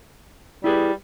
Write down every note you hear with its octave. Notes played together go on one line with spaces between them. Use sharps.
G3 E4 G#4 B4